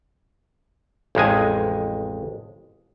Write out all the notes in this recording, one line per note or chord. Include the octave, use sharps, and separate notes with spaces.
A1 F2 G#3 G#5